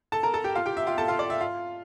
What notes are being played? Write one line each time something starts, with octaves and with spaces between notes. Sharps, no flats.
A4 A5
A#4 A#5
A4 A5
G4 G5
F4 F5
G4 G5
E5
F4 F5
A4 A5
F4 F5
D5
E5
F4 F5